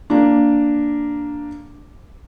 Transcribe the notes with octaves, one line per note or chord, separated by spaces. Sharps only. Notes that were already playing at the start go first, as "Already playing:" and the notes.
A#3 D4